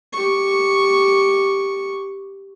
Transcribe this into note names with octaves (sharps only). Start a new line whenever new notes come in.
G4 C#6